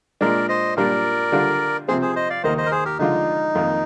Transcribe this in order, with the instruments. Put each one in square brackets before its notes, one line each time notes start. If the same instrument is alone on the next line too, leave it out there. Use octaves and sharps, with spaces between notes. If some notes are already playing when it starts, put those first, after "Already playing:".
[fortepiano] A#2 G#3 D4 [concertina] A#4 D5
[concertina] C5 D#5
[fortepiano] A#2 G3 D4 F4 [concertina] A#4 D5
[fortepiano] D3 G3 D4 F4
[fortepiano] C3 F3 C4 [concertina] G#4 C5
[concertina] G#4 C5
C5 D#5
D5 F5
[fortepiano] D#2 D#3 A#3 D#4 [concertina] C5 D#5
[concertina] C5 D#5
A#4
G#4 C5
G4 A#4
[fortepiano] D3 F3 G#3 D4 F4 [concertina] D#4
[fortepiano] F2 D#3 A#3 F4